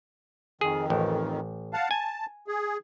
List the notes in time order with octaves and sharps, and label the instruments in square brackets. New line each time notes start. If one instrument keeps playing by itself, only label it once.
[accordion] F2 D#3 [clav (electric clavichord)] G#4
[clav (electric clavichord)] A1
[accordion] F5 F#5 A5
[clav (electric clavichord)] G#5 [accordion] A5
[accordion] G#4